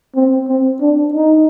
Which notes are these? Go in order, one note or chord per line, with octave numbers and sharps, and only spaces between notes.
C4
C4
D4
D#4